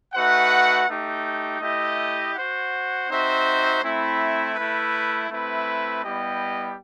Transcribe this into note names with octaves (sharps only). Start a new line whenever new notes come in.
A3 D#4 F#4 B4 F#5
A3 D#4 G4
A3 E4 G4 D#5
F#4 C5 F#5
C4 D#4 F#4 C5 E5
A3 C4 E4
A3 E4 B4
A3 C4 E4 B4 E5
G3 B3 E4 G4 D#5